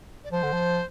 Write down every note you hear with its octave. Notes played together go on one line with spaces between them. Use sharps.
D5
F3 C5
D3
F3